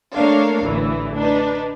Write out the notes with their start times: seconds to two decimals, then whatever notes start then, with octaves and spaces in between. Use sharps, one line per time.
0.16 A3 A#3 D4 A#4 C#5 F5
0.63 A1 D2 E3
1.16 D4 D#4 B4